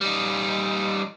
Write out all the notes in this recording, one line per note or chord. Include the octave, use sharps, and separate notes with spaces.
G3 D#4